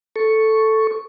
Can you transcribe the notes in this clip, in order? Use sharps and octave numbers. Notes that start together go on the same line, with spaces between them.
A4 C#6